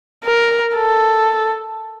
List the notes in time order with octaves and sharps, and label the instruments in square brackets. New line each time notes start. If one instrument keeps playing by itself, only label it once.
[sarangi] A#4
A4